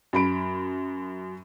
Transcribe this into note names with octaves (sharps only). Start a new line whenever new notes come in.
F#2 B5 D7